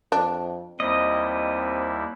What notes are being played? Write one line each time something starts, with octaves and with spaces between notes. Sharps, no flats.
F2 D4
D#2 G3 C4 E4 D#5